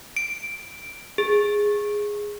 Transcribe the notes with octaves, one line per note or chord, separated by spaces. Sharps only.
D7
G#4